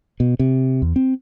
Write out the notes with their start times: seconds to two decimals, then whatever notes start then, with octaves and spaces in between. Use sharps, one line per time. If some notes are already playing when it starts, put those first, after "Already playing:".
0.20 B2
0.39 C3
0.82 E2
0.96 C4